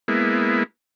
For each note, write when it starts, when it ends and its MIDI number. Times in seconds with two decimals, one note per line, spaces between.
0.08 0.63 56
0.08 0.63 58
0.08 0.63 59
0.08 0.63 64